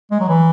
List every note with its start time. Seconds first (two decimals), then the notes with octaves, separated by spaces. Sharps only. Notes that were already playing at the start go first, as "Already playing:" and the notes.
0.11 G#3
0.20 F#3
0.28 E3